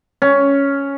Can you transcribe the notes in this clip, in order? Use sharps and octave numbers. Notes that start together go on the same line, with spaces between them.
C#4